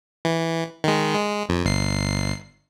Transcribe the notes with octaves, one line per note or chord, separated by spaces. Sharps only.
E3
D#3 G#3
G#3
F2
G1 C7